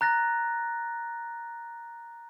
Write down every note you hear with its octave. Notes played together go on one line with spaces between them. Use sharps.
A#5 F#6 A6 A#6